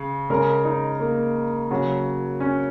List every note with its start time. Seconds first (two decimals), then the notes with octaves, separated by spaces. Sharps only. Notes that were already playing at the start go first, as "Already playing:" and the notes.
Already playing: C#3
0.30 C#3 G#3 A#4
0.65 D#4
1.00 A#3
1.71 C#3 F#3
2.40 C#4